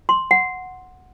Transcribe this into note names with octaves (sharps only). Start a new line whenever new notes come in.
C6
F#5